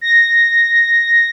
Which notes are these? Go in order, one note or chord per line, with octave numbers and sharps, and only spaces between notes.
A#6